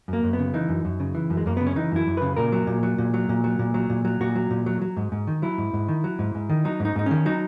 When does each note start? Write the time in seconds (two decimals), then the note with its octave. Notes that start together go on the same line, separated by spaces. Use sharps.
0.08 F#2 A#3
0.24 F#2
0.33 B3
0.39 C#3
0.54 E3 D#4
0.69 F#2
0.85 F#2
1.00 C#3
1.15 E3
1.30 F#2
1.37 G#3
1.46 F#2 A#3
1.57 C#3 B3
1.67 C#4
1.76 E3 D#4
1.92 F#2 E4
2.07 F#2
2.17 C#3 B4
2.37 A#2 A#4
2.52 F#3
2.67 A#2
2.83 F#3
2.98 A#2
3.14 F#3
3.29 A#2
3.44 F#3
3.59 A#2
3.74 F#3
3.90 A#2
4.05 F#3
4.21 A#2 F#4
4.36 F#3
4.51 A#2
4.66 F#3
4.82 F#3
4.97 G#2
5.12 G#2
5.27 D#3
5.42 F#3 E4
5.58 G#2
5.73 G#2
5.88 D#3
6.04 F#3
6.19 G#2
6.35 G#2
6.49 D#3
6.65 F#3 D#4
6.80 G#2 D#4
6.96 G#2 D#4
7.06 D#3 C#4
7.26 F#3 D#4